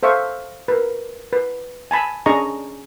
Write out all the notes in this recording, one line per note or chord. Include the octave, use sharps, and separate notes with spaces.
A4 C5 E5 F5 C#6
A#4 B4
B4
G#5 A5 B5
C#4 D4 G#4 D#5 A#5 C#6